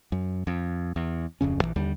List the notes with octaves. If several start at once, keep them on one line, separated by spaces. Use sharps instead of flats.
F#2
F2
E2
D1 F2 C#3 C#4
A#1 F2 E3
D#2 D3 G3